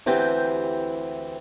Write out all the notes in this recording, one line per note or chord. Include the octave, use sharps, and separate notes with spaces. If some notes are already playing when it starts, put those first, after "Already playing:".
D2 E3 C4 G4 G5